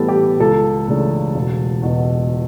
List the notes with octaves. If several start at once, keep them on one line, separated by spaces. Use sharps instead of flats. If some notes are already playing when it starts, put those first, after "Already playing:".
Already playing: A2 E3 G3 B3 A4
G4
C#2 A4
C#3 E3 A3 D4
E1
E2 B2